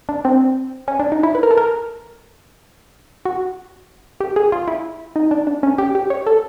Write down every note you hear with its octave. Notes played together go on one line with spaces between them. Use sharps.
D4
C4
C#4
D4
D#4
E4
B4
A#4
A4
A#4
F#4
G4
G#4
F4
E4
D#4
D4
D4
C#4
G4
G4
C#5
A4